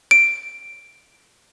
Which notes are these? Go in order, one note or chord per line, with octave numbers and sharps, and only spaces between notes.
D7